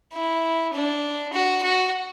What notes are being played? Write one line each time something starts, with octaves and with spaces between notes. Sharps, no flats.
E4
D4
F#4
F#4